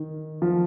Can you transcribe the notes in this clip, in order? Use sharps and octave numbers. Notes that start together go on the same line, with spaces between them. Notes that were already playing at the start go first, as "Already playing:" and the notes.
Already playing: D#3
F3